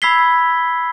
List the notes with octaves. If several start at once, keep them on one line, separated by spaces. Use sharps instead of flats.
B5 E6 G#6 B6 C7 G7